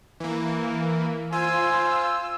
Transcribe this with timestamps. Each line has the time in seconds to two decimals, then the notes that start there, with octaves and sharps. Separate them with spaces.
0.20 E3 A#3
1.32 F4 C5 G#5 E6